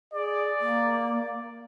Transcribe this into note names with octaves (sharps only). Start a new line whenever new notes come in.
G#4 D5
A#3